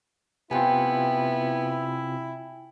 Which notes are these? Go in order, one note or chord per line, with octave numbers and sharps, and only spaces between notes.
C3 B3 C4 E4 F4 G5 G#5